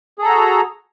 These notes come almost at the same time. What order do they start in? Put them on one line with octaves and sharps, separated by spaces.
G#4 A4 A#5 F#4